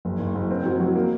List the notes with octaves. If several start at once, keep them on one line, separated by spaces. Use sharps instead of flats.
F#1
F#1
F#1
C4
F#3
F#3
A#3